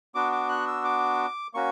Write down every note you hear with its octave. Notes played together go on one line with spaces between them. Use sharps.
B3 D4 F#4 D6
D6
F#6
E6
D6
A#3 C#4 F#4 C#6